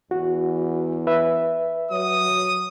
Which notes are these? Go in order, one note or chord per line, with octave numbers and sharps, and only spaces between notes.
E2 F#4
B4 E5
F#3 D#6